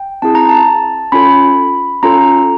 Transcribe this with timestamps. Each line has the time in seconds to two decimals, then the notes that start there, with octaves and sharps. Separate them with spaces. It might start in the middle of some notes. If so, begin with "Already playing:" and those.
Already playing: G5
0.22 C4 E4 G#4 A5
0.35 A#5
0.49 A5
1.12 C#4 F4 A4 B5
2.03 C#4 F4 A4 A#5